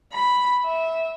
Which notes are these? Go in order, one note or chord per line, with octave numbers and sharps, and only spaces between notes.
B5
E5